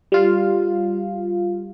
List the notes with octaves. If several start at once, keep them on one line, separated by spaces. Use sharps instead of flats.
G3 F4 F5